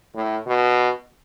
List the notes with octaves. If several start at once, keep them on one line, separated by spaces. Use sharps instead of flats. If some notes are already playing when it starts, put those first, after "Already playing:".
A2
B2